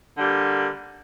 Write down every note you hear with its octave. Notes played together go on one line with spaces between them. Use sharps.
D3 G3 A#3